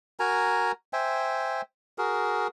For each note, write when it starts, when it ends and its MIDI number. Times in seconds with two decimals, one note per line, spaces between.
0.19 0.72 66
0.19 0.72 70
0.19 0.72 80
0.19 0.72 82
0.93 1.61 72
0.93 1.61 76
0.93 1.61 79
0.93 1.61 80
1.98 2.47 66
1.98 2.47 68
1.98 2.47 70